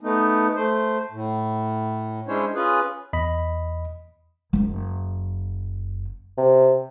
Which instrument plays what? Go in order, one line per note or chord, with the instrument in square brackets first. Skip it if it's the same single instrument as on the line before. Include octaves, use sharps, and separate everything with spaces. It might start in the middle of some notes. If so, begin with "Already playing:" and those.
[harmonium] A3 B3 D#4
A3 C5
A2
G#3 C#4 D4 E4 C5 C#5
C#4 F4 G#4 B4
[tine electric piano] E2 D#5 B5
[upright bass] F#1 F#2
[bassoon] C3